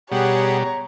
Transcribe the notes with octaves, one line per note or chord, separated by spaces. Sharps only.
B2 G3 G4 G#4 C#5 F#5 A#5